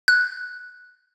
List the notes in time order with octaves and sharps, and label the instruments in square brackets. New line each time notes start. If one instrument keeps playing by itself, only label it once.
[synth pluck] F#6